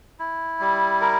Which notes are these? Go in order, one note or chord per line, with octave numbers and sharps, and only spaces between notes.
E4
G3
A#4